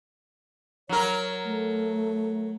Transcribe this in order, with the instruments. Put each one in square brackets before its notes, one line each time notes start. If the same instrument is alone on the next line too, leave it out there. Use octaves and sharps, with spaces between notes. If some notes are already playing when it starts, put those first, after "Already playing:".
[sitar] F#3 A#4 [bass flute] C#5
[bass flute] A3